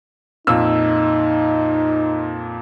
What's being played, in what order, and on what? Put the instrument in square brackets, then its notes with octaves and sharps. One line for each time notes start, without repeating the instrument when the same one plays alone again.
[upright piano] F2 A#2 E6 [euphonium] D#4